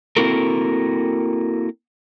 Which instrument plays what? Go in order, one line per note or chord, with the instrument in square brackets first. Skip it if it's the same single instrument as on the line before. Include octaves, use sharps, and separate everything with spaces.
[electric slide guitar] A#3 C4 E4 F#4 A4 A#4